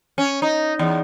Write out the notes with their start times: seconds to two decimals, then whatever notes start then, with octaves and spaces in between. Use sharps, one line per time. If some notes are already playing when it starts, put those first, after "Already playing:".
0.18 C#4
0.42 D#4
0.79 E2